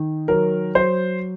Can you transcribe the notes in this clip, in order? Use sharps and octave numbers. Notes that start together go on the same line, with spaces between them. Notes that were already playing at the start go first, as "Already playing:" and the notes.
Already playing: D#3
F#3 A#4
F#3 C5